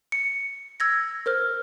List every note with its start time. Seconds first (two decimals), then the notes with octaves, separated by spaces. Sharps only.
0.12 C#7
0.80 E6 G#6 A#6
1.26 A#4 C5 F6